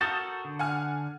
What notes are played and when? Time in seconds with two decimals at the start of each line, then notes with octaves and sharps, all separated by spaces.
0.01 F#4 A4 A#4 D#6 G6 A6
0.45 D3
0.59 F#5 G#5 F6